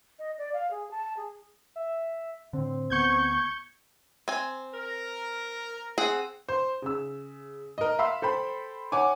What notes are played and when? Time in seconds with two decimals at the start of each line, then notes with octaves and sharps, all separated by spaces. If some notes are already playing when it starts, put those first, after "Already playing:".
0.18 D#5
0.37 D5
0.53 F5
0.70 G#4
0.91 A5
1.16 G#4
1.76 E5
2.53 A2 D3 C4
2.90 D2 B3 C#6 G6 G#6
4.28 C4 G#5
4.74 A#4
5.98 C4 G#4 F#5
6.49 C5
6.82 C#3 E6
7.78 A#4 D#5
7.99 E5 F5 B5 C6 E6
8.22 A4 C5 G5 B5
8.92 C#5 F#5 G#5 D6